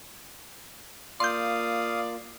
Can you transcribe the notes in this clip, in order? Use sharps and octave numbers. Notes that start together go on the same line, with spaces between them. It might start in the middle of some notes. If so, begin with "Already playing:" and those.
A#3 F4 D5 F5 C6 D#6 G6